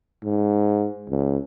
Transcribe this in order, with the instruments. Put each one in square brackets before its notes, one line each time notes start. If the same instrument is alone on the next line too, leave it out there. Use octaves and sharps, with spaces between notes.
[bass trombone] G#2
C#2